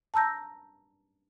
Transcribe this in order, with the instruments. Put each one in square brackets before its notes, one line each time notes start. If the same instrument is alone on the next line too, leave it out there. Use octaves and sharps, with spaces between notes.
[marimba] A5 A#5 E6 G6 A#6